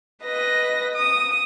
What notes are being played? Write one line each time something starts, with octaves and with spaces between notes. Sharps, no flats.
B4 D#5 A#6
D#6